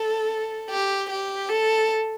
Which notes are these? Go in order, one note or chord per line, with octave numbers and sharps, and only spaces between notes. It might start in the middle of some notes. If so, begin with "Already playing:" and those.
Already playing: A4
G4
G4
A4